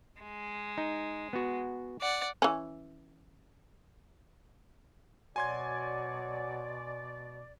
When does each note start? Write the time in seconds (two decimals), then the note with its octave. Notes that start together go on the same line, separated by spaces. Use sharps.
0.22 G#3
0.78 D#4
1.33 B3 F#4
2.01 D5 F#5
2.42 E3 C#4
5.36 B2 F#3 D5 G#5 C6 G#6